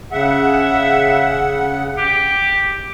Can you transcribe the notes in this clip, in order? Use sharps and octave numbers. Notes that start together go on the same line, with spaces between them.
C#3 E5 F#5
G4